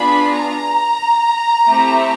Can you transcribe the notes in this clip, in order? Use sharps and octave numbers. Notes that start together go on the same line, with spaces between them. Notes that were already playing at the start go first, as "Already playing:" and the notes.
Already playing: B3 D4 F4 G#4 B5
A#5
A3 C4 E4 G4